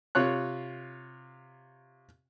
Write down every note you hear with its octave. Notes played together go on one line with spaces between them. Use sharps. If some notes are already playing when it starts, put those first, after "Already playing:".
C3 F4 C#5 F#6